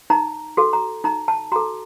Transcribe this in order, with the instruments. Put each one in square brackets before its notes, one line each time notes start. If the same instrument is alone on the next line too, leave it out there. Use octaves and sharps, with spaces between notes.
[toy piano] D#4 A#5
F#4 A4
A#5
D#4 A#5
A5
F#4 A4 A#5